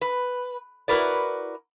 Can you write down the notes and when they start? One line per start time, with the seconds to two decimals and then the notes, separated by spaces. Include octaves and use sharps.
0.01 B4
0.88 E4 F#4 A#4 B4 D5